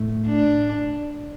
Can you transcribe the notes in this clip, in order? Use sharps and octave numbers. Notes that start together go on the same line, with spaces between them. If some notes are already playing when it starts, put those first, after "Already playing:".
Already playing: A2 A3
D4